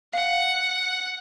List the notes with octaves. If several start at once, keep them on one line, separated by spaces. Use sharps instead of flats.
F5 F#5